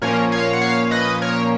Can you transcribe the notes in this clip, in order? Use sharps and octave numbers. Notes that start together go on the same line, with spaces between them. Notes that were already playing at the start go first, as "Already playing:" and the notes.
A#2 F3 A#3 C#4 A#4 C#5
C#5 F5
F#5
C#5 F5
B4 D#5
A#4 C#5